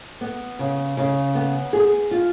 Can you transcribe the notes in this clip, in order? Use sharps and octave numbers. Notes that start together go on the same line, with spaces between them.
B3
C#3
C#3
B3
G#4
F4